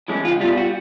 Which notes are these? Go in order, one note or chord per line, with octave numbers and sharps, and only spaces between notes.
E3 G#3 C#4
C#2 F4
B2 G3 F4
F#4